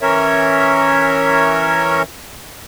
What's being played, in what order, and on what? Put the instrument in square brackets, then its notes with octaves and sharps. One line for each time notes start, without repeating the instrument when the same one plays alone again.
[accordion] E3 C#4 A#4 C#5 E5